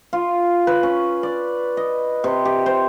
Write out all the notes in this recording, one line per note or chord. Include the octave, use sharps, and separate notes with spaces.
F4
B4
C#4
D5
D#5
C3
G4
C5